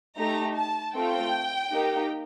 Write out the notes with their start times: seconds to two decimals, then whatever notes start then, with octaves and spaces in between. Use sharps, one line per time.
0.17 A3 D#4 G4 A#5
0.56 A5
0.95 A3 C4 F4 A4 G5
1.72 A#3 D#4 G4